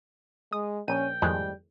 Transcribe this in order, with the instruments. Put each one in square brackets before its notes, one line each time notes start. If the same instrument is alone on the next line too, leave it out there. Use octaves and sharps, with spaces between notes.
[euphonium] G#3 [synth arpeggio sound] D#6
[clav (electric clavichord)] A#1 [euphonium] C#4 [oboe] G5 [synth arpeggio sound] D#7
[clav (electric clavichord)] G#1 A2 G#3 [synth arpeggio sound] F2 F#6 [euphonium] G3